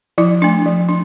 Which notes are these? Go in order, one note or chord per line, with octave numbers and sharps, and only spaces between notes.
F3 E4
A3 D4
F3
D4